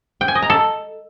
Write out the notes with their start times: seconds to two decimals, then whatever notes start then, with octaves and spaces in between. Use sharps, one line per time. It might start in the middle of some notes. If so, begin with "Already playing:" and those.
0.21 G5
0.28 G#5
0.35 D#5
0.42 A#5
0.50 A4